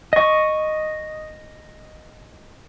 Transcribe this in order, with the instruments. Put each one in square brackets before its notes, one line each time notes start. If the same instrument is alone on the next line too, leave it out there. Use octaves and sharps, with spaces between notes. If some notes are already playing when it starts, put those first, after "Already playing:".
[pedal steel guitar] D#5 C#6